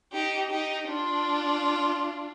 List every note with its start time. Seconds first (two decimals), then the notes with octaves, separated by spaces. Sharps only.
0.14 D#4 G4
0.50 D#4 G4
0.87 D4 F4